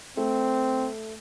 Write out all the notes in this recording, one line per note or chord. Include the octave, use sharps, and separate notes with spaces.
A3 C4